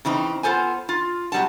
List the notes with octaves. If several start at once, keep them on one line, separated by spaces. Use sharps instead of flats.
C#3 E3 C4 D#4
B3 F4 A4 C5 G#5
F4
C3 F#3 G3 F#5 A5